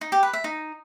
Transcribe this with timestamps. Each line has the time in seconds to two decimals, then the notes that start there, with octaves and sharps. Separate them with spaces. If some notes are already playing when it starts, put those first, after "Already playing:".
0.01 D#4
0.12 G4
0.23 B4
0.33 E5
0.44 D#4